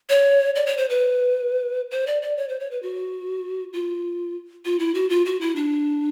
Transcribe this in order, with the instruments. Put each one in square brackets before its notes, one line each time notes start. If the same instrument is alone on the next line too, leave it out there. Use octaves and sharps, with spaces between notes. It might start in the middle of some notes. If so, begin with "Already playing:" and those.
[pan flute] C#5
D5
C#5
C5
B4
C5
D5
D5
C#5
C5
C#5
B4
F#4
F4
F4
E4
F#4
F4
F#4
E4
D4